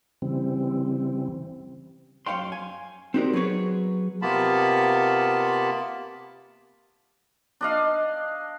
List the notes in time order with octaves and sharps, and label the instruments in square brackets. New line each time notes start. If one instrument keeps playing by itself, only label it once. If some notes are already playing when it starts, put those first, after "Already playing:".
[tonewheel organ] C#3 E3 G3 C4
[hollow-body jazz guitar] F#2 C#5 F5 G5 C6
G#5
C4 D#4 F#4 G4 A#4 D5
F#3 B3 G#4 B4 C#5
[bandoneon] C3 A#3 B3 F4 A5 B5
[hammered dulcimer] D4 D#5 F5